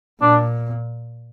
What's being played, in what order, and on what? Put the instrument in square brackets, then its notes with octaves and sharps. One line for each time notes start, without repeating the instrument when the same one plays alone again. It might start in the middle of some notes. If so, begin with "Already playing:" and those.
[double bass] A#2 [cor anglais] D4